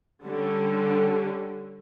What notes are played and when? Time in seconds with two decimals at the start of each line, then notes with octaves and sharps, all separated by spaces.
0.24 D3 G3 C#4